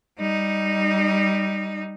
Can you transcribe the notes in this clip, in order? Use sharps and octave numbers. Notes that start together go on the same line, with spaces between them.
G3 D#4